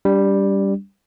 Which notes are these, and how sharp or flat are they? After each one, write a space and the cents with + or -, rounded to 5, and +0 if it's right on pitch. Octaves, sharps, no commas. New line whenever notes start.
G3 +0 D4 -30